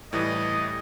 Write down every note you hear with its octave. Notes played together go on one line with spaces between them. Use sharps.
A2 E3 G3 D#5